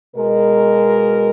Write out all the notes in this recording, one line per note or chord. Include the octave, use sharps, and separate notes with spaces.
B2 G#3 A#4